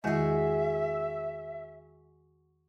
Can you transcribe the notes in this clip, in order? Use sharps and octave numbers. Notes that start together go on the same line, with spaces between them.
E2 D#3 G#3 F#4 G#4 E5